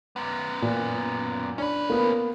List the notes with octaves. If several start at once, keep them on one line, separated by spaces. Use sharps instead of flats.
F#2 B3
A#2
C#4 D4 B4
A#3 B3